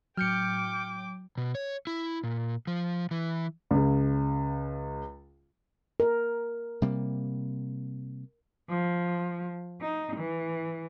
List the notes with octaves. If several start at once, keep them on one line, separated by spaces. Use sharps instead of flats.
A2 F#3 G5 D6 F6 G6 C#7
B2
C#5
E4
A#2
F3
E3
C#2 C#3
A#4
C3 G3 A#3
F3
D#4
E3